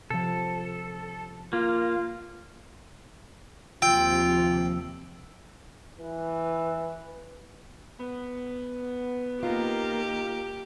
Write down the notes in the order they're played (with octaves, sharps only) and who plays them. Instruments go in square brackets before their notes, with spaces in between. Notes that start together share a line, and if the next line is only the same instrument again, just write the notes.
[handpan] C3 F3 [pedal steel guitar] A4
[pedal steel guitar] A#3 [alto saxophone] F4
[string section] D#2 C3 F3 [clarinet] F4 [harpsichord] G5 [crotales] E6
[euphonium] E3 [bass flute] B4
[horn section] B3
[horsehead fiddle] A#3 A#4 [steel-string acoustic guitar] D#4 F4 [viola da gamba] G4